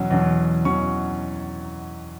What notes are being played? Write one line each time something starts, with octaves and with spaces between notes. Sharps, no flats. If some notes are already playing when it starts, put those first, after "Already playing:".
Already playing: E2 B2 F#3 C#4
E2 B2 F#3 C#4
E2 B2 F#3 C#4 C#6